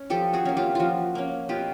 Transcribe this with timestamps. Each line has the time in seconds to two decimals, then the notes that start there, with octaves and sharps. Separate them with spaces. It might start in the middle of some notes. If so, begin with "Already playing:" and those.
Already playing: C#4
0.10 F3 G4 A4
0.33 F#4 G#4
0.45 A#3 C#4
0.57 F4 G4
0.75 F3 F4 F#4
1.15 A#3 C#4
1.49 B2 F4 G4